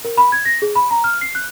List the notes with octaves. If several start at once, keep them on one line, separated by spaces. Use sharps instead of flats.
A#4
B5
G#6
A#6
G#4
B5
A#5
F6
C7
F#6